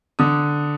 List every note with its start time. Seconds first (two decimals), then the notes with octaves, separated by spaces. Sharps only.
0.19 D3 D#6